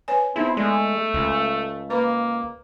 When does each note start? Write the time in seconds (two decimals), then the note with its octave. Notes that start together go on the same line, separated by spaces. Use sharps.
0.08 B4 C#5 G#5
0.36 B3 C4 D#4 E4 G#4
0.57 G#3 A3 D5
1.14 C#2
1.90 A#3 B4 B5